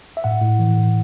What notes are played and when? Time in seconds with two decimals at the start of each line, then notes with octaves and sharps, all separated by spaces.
0.17 E5
0.24 A2 F#5
0.41 A2
0.59 E3
0.77 A2